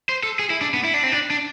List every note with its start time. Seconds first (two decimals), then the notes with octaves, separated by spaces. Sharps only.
0.09 C5
0.23 A4
0.39 G#4
0.50 E4
0.61 D4
0.74 B3
0.84 E4
0.94 D4
1.03 C4
1.12 D4
1.30 D4